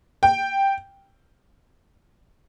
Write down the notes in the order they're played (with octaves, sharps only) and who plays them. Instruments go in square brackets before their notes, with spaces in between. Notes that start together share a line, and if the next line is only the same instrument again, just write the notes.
[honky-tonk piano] G5